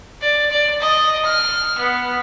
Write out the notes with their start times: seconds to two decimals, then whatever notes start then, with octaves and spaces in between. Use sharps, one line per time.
0.22 D5
0.50 D5
0.80 D#5
1.25 F6
1.78 B3